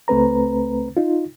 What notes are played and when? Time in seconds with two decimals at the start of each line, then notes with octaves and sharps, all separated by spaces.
0.08 C#2 A3 C4 B4 A#5
0.97 D#4 F4